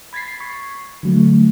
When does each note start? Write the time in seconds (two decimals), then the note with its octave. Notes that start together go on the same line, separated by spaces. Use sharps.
0.13 B5 G#6 A6 B6 C7
0.40 C#6
1.03 D3 F#3 A3